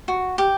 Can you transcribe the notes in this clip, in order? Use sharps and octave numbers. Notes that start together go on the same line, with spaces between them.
F#4
G4